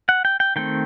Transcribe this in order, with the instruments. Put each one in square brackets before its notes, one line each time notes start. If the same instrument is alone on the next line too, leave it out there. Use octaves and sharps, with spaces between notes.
[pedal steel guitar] F#5
G5
G5
D#3 A3 C4 G5